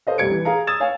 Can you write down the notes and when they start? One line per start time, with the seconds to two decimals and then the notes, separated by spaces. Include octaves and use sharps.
0.07 A4 C5 D#5 F5
0.18 C2 G3 G#6 C#7 D7
0.31 E3
0.45 G#4 F5 A#5
0.67 D#6 E6 G#6 A6 E7
0.80 C#5 F5 G#5